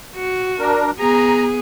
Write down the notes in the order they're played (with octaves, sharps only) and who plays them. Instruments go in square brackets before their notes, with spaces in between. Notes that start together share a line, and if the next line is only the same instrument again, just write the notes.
[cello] F#4
[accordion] D4 A#4
[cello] B3 G#4 [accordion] A#5